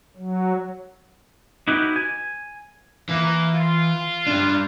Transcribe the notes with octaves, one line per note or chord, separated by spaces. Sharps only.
F#3
D#4 E4 F#4 G4 B4 D#5
G#5
E3 A#3
F4
G3 D4